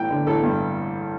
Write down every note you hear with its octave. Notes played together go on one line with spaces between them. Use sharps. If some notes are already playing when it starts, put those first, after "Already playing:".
Already playing: A1 G5
D3
A1 A4
G2